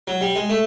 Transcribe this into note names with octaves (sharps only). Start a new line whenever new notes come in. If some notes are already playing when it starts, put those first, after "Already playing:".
F#3
G3
G#3
A3